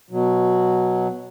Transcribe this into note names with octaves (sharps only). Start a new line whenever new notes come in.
B2 F#3